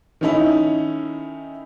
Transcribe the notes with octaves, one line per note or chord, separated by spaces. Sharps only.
D#3 A3 C#4 D#4 E4